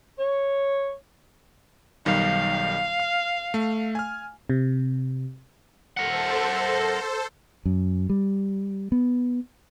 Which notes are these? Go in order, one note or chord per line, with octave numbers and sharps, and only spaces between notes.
C#5
B1 D#3 G3 F5
F6
A3
G#5 F6
C3
A4 A#4 C5 F#5
F#2
G3
B3